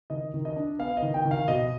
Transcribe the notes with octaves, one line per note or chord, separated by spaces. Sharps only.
D#3 D#5
D#3
D#5
D4
B3 F5
D#5
D#3
G5
D#3
F5
B2 D#5